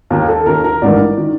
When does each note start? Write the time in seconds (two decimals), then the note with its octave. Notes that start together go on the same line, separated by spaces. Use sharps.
0.10 D#2 D#3 A#4
0.28 A4
0.46 D#2 D#3 A#4
0.64 A#4
0.82 A1 G2 D#3 D5
1.17 D#3